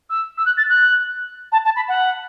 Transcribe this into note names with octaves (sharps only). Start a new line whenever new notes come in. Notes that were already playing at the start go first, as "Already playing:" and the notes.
E6
E6
F#6
A6
F#6
A5
A5
B5
F#5